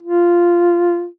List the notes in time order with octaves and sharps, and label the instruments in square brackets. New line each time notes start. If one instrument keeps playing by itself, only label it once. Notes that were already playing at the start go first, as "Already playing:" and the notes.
[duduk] F4